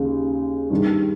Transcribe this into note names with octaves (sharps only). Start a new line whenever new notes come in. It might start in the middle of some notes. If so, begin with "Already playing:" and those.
Already playing: D#2 C#3
G2 D#3 G3